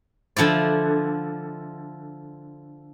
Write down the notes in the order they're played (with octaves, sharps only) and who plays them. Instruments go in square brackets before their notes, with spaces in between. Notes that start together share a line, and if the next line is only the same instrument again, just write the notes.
[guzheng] D3 F3 E4 D5